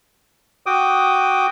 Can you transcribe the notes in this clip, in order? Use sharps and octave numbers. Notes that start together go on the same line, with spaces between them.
F#4 G5 D6 D#6